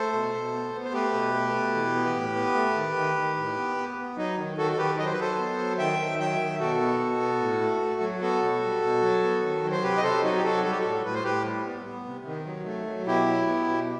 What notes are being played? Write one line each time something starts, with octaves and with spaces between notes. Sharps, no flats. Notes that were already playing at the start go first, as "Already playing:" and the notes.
Already playing: A3 A4 C5
B2
B2
B3
B3
C5
A3 G4 B4
B2
A3
B2
E3
B3
A2
B3
A3
D#3
D#3
D#3
A2
B3
B3
B3
F#3 D#4
D#3
D#3 F#4 A4
A4
D#3 G4 B4
F#3 D#5
C5
B4
F#3 A4 C5
B3
F#3
D#3 E5 G5
D#3
F#3 E5 G5
D#3
B2 F#4 A4
B3
B2
B3
A2
A3
A3
F#3
B3 F#4 A4
B2
G3
B2
F#3
B3
D#3
F#3
C5
C3 G4 B4
D#5
C3 A4 C5
F#3 D#4 F#4
G4
F#3 F#4 A4
G3 A4
G4
F#4 A4
A2
A2 B4
C5
A2 G4 B4
G3
B3
B3
C3
D#3
F#3
A3
F#3
B2 E4 G4
F#3
B3
B2